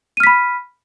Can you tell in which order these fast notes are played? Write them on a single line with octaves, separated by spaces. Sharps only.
D#7 F6 B6 B5